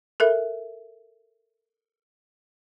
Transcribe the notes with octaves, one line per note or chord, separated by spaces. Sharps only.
A4 A#4 E5